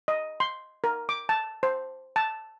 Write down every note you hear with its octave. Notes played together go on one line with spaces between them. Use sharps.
D#5
C6
A#4
D6
A5
C5
A5